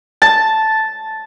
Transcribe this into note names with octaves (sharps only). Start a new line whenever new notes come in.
A5